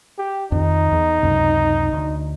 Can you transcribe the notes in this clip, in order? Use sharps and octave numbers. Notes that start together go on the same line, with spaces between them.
G4
F2 D#3 D#4
E2
C#2 F#2 C3
D2